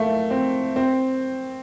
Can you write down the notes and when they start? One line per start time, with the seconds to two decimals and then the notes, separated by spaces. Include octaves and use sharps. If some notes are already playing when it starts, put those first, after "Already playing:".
Already playing: A3 A#3
0.30 C4
0.76 C4